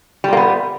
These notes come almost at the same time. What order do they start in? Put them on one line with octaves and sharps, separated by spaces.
G3 A#2 A#3 B3